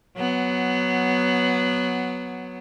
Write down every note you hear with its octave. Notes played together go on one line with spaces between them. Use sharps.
F#3 B3